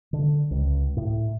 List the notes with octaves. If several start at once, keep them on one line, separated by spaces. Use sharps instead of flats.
D3
C#2
A2